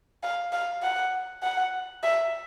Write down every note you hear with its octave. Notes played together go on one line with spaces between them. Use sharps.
F5
F5
F#5
F#5
E5